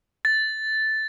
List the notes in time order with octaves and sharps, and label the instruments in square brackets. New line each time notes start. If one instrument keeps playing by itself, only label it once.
[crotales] A6